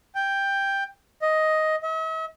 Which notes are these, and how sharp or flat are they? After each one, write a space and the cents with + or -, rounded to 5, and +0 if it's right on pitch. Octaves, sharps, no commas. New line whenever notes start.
G5 +10
D#5 +10
E5 -45